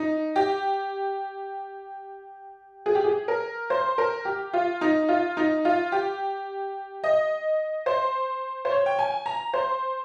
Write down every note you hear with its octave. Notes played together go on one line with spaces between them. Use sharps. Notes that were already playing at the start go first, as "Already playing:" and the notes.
Already playing: D#4
G4
G#4
G4
G#4
A#4
C5
A#4
G4
F4
D#4
F4
D#4
F4
G4
D#5
C5
C5
C#5
G5
G#5
A#5
C5